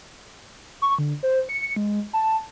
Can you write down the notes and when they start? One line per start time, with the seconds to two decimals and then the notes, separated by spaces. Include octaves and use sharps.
0.82 C#6
0.98 D3
1.23 C5
1.49 C#7
1.76 G#3
2.13 A5